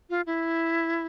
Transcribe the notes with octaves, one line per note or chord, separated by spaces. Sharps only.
F4
E4